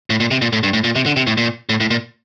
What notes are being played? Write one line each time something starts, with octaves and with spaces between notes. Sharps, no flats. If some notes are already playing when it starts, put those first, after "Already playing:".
A2
A#2
C3
A#2
A2
G2
A2
A#2
C3
D3
C3
A2
A#2
A2
A2
A#2